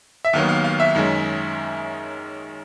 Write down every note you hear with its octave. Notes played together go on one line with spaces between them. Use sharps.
E5
D#2 D#3 F#3 B3 F5
F5
F5
E5
F#2 D#3 G#3 C#4